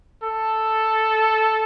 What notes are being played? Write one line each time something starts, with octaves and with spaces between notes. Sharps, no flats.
A4